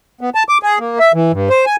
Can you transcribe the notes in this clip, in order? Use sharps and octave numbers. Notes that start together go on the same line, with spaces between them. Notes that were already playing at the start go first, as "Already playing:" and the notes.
B3
A5
D6
G#4
A#3
E5
E3
G2
C5
G#5